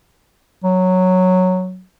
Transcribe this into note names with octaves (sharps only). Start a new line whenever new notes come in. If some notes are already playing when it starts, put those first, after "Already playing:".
F#3